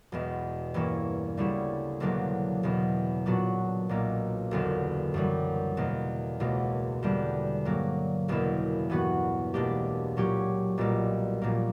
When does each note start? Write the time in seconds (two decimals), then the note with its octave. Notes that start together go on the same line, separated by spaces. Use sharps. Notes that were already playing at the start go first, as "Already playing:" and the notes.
0.12 E1 E2 B2
0.74 G2 E3 A#3 C#4 E4
1.37 D2 C#3 G3 C#4 E4
2.00 E1 E2 D3 F#3 A#3
2.63 E1 E2 B2
3.26 A#2 F#3 B3 D4 F#4
3.89 B1 A#2 A#3
4.51 F#1 E2 D3
5.14 F#2 E3 G3
5.77 E2 B2 A#3
6.40 C#2 B2 A#3
7.03 E2 D3 G3
7.65 G2 F#3 A#3
8.28 F#1 E2 B2 A#3 E4
8.90 G2 E3 B3 F#4
9.54 C#2 B2 A#3 D4 G4
10.17 A#2 F#3 C#4 G4
10.78 B1 A#2 G3 A#3
11.42 A#1 A#2 A#3